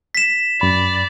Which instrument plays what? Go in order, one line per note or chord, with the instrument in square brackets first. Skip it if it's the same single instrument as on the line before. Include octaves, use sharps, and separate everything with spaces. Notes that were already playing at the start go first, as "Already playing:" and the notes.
[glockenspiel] B6 E7
[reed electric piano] F#2 B5 [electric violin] D5